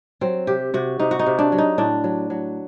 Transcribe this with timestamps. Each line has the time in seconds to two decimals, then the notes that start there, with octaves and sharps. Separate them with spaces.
0.21 F#3 C4
0.47 C3 G4
0.74 C3 F#4
0.99 C3 D#4
1.11 F#4
1.19 D#4
1.26 C3
1.39 D4
1.52 F#3
1.58 D#4
1.78 A2 D4
2.04 F#3
2.30 F#3